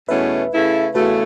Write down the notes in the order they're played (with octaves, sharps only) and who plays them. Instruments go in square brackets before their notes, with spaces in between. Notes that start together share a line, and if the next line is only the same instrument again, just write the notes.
[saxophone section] E2 B2 A3 C#4 [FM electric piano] B4 E5
[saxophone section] C#3 A3 E4
[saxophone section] E2 C#3 A3 [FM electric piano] F#4 B4